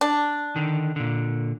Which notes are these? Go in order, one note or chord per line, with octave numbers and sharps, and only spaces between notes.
D4
D3 D#3
A#2 D3